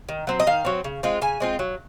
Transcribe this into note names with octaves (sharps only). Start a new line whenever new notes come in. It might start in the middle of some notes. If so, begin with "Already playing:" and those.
D#3
F#3 C4
D#5
D#3 F5
F#3 C4
C#3
G#3 C4 F4
C#3 G#5
G#3 C4 F4
F#3